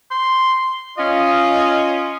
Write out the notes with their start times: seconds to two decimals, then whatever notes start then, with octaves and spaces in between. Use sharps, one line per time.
0.11 C6
0.98 C#4 F4 D#5